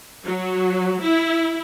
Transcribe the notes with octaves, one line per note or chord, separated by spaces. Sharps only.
F#3
E4